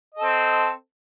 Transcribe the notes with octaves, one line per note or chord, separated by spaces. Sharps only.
C4 A4 D#5